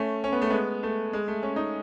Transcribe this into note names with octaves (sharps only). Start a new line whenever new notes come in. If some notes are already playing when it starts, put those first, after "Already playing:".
Already playing: A3 C#4
C#4
B3
A3
G#3 B3
A3
G#3
A3
C#4
D#4